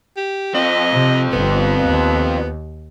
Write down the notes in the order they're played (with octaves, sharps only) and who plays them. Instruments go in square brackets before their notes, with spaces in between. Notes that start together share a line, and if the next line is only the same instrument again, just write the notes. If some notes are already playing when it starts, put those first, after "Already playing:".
[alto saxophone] G4
[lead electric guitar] F2 C4 [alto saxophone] D#5
[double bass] C3
[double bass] G1 [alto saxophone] B3
[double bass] D#2